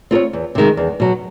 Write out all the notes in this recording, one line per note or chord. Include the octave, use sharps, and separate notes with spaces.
C4 F4 A#4 C#5
E2
C3 D#3 G#3
E2
B2 F#3